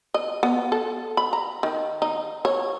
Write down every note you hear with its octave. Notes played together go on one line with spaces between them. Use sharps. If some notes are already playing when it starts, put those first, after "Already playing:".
D#5
B3
A4
B5
A#5
D#3
D#4
C#5